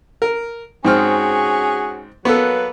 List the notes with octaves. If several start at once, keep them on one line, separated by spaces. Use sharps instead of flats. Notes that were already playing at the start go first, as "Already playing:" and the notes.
A#4
G#2 C4 C#4 F#4 G#4 F6
F#3 A#3 B3 A4 B4